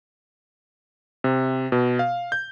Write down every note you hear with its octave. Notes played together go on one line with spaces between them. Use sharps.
C3
B2
F5
G6